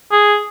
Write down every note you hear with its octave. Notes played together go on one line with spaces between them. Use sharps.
G#4